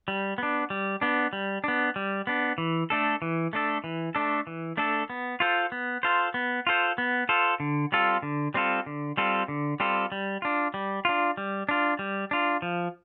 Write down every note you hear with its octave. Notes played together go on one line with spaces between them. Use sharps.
G3
B3 D4
G3
B3 D4
G3
B3 D4
G3
B3 D4
E3
A3 D4 A4
E3
A3 D4 A4
E3
A3 D4 A4
E3
A3 D4 A4
B3
F4 A4 C5
B3
F4 A4 C5
B3
F4 A4 C5
B3
F4 A4 C5
D3
G3 C4 F4 A4
D3
G3 C4 F4 A4
D3
G3 C4 F4 A4
D3
G3 C4 F4 A4
G3
D4 F4
G3
D4 F4
G3
D4 F4
G3
D4 F4
F3